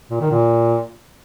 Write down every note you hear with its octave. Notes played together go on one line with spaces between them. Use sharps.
A#2
D#3
A#2